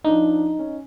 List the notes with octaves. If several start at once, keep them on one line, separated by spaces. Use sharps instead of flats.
F3 D4 D#4
C#4